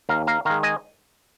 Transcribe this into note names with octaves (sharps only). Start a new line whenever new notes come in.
D#2 F5 A#5
F5 A#5
D#3 G#3 F5 A#5
D#5 G#5